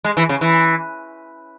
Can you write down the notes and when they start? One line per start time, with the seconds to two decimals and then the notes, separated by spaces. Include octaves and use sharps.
0.04 G#3
0.17 E3
0.29 C#3
0.41 E3